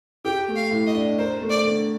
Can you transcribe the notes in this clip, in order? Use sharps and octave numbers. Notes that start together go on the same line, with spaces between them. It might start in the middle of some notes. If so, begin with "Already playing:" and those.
G4 G5
A3
F5
A2
D#5
D4
A#4 C5
A3
D5
D3